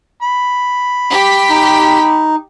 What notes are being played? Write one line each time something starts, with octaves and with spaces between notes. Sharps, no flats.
B5
G4 B6
D#4